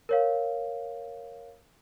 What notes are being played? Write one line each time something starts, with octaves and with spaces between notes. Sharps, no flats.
A#4 C#5 F5